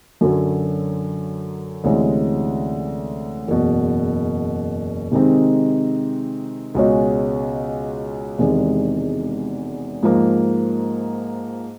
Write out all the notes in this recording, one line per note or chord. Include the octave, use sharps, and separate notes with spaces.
F#2 D3 F#3
D2 C3 E3 G#3 C#4
F#1 E2 B2
C3 D#3 G#3 C4 D#4
C#2 B2 G#3 C#4 F#4
E1 E2 C3 D#3 G#3
G#2 F3 A#3